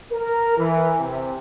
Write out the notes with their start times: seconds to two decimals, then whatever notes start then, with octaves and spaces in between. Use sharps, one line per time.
0.12 A#4
0.57 E3
0.99 C3